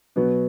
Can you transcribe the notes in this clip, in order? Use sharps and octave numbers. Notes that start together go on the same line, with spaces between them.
B2 F#3 B3